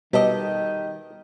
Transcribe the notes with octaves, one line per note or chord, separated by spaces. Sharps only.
B2 D#3 G3 G4 A4 D#5